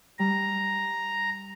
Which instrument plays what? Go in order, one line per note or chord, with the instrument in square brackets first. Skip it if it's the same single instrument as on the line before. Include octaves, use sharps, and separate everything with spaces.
[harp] G3 [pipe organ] A#5